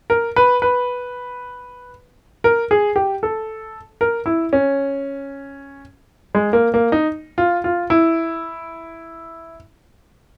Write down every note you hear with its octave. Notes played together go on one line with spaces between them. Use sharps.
A#4
B4
B4
A#4
G#4
G4
A4
A#4
E4
C#4
G#3
A#3
A#3
D#4
F4
F4
E4